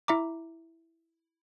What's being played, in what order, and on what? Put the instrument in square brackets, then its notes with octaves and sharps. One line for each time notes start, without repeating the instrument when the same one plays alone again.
[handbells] E4 E5 A#5 D6